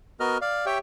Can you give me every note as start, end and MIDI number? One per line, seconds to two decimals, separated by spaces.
0.20 0.38 59
0.20 0.38 66
0.20 0.38 70
0.20 0.38 75
0.20 0.38 89
0.41 0.66 74
0.41 0.66 77
0.66 0.78 67
0.66 0.78 73
0.66 0.78 76
0.66 0.78 79